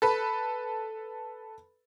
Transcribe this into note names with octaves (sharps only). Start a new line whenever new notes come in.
A4 B4